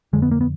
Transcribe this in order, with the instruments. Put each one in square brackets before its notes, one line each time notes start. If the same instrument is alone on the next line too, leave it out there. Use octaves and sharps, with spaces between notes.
[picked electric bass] F2 D3 G#3
B3
A#3
B3